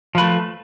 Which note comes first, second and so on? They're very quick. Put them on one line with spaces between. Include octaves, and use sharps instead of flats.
F3 B4 A3